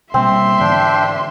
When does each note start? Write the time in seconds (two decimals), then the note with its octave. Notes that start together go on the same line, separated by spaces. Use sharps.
0.14 B2 G3 A#3 C4 E5 C6
0.60 G#2 D3 E3 D4 G5